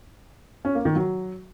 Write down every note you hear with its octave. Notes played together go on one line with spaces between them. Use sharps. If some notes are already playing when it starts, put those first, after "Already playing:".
C#4
A#3
D#3
F#3